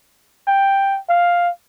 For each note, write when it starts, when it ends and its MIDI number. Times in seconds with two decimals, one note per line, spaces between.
0.48 0.99 79
1.10 1.50 77